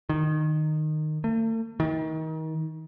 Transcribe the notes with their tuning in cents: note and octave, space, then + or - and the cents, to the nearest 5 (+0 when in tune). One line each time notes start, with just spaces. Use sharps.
D#3 -15
A3 +45
D#3 +30